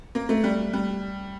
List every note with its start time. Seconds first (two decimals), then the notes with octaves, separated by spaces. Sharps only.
0.15 A#3
0.29 A3
0.44 G3
0.73 G3